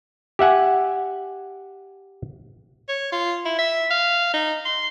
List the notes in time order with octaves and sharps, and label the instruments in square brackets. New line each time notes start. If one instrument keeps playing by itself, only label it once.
[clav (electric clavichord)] G4 E5 F#5 G#5
[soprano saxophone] C#5
F4
E4
E5
F5
D#4
C6